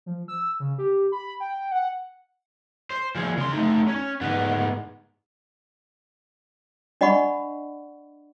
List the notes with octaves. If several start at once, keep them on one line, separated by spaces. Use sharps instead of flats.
F3
E6
C#3
G4
B5
G5
F#5
C5
F3 G#4
C#3 C6
A3 D#4
C#4
G#2 B3
D4 D5 D#5 F#5 B5 C#6